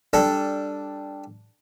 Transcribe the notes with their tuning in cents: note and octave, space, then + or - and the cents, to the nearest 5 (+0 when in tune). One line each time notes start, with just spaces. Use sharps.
G3 +0 D4 +0 A4 +0